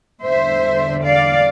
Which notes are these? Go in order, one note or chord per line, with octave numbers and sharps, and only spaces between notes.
E2 D3 G3 C5 E5
D5 F5